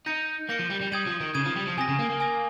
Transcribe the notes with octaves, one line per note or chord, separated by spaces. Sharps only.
D#4 G6 A#6 C#7
A#3 G6 A#6 C#7
F3
G3
G3
G3 D#6 G#6 D#7
F3
D#3
C#3 D#6 G#6 D#7
F3
G3
F3
C3 G#5 D#6 A#6
C#3
A#3
A#3
G#5 D#6 A#6